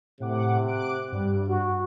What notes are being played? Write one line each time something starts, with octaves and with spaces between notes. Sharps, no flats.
A2 C3 F#5 D6
D6 F#6 D7
G2 G3
F#4